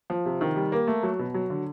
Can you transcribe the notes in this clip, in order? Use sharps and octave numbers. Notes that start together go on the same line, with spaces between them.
F3
C3
D#3
G3
A#3
A3
F#3
B2
F#3
D3